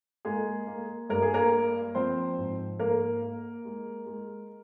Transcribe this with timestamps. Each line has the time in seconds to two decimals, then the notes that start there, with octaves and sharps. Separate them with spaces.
0.25 G#3 A#3 G#4
0.67 A#3
1.10 G2 A#4
1.22 G#4
1.34 A#3 A#4
1.52 A#3
1.95 F3 C4 C5
2.37 G#2
2.79 A#3 A#4
3.22 A#3
3.65 G#3
4.06 G#3